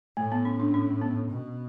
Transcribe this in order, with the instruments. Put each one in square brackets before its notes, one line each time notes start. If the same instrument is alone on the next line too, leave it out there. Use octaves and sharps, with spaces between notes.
[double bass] A2 [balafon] A3
[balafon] B3
C#4
D4
C#4
B3
[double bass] B2